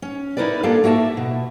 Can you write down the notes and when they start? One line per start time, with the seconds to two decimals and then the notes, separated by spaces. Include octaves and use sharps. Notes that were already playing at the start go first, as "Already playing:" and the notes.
0.02 C#4
0.37 D#4 E4 A#4 B4 D5
0.63 A#3 D4 F4 G4 A4
0.84 A#3 F#4 E5 A5
1.17 B2